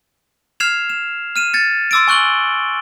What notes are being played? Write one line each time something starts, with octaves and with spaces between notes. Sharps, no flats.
F6 G#6 C7 E7 F7
E7
F6 D#7 E7
G#6 A6 C#7
C6 D6 E6 A6 D7
G#5 C#6 F#6 F#7 G7